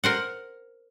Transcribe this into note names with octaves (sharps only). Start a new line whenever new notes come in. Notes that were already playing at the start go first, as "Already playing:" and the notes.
A#4 C5 F#5